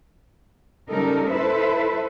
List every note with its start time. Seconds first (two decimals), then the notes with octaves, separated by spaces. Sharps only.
0.90 C#3 G3 D#4 A4 A#4
1.30 E4 A4 B4 C5 E5